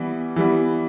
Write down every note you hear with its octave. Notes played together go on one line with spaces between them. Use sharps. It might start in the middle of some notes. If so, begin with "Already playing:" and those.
Already playing: E3 G3 B3
E3 G3 B3